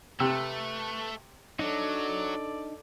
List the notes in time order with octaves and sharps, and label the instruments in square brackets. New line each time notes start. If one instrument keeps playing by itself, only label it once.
[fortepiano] C3 [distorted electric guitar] A3 [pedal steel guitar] B4 E6
[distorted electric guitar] F#3 [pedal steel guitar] D4 D#4 [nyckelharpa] A4 D5